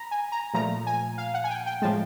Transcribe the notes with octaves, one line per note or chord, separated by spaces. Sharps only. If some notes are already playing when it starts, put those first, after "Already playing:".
Already playing: A#5 B5
G#5
A#5
A#2 F3 A3 A#5
G#5
F5
F#5
G#5
G5
G5
A2 F3 G#3 A5